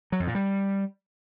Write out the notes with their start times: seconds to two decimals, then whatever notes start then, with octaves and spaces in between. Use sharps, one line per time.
0.12 F#3
0.20 F2
0.27 A#2
0.35 G3